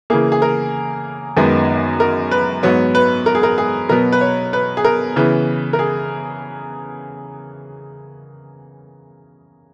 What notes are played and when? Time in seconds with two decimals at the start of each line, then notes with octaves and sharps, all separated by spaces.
0.10 C#3 E3 A#3 G#4
0.32 G#4
0.42 A#4
1.37 F#2 D#3 G#3 B3
2.00 A#4
2.31 B4
2.63 G#2 F#3 B3 C#5
2.95 B4
3.26 A#4
3.35 G#4
3.43 A#4
3.58 G#4
3.89 B2 F#3 B3 A#4
4.12 B4
4.21 C#5
4.53 B4
4.77 G#4
4.85 A#4
5.16 C#3 E3 B3
5.73 A#4
5.79 G#4